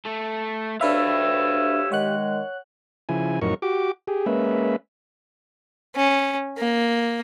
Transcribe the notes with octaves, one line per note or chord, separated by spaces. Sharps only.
A3 A4
D2 D4 G4 B4 C#5 E5 F5 E6
D#3 G#3 C#5 F#5 F#6
C#3 F3 E4 G#5
F2 A2 F#3 D#4 A#4 C#6
F#4 G4 D6
G4 G#4
G#3 A#3 C#4 B4 E5
C#4
A#3